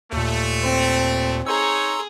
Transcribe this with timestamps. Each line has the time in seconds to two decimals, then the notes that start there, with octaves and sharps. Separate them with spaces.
0.13 D#2 A#2 A3
0.63 C4
1.47 D#4 G#4 C#5 A#5 C6 E6